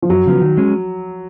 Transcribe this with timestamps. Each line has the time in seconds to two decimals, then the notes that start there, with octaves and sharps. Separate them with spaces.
0.02 F3
0.09 F#2 F#3
0.26 C#3 F3 B3
0.41 D#3
0.57 G#3 C#4